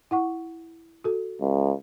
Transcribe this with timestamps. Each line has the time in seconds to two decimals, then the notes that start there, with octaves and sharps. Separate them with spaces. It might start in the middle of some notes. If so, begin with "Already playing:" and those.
0.11 E4 F#5 C#6
1.04 F#4 A4
1.41 C#2